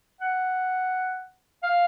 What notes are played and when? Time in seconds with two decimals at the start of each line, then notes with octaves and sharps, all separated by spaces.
0.21 F#5
1.63 F5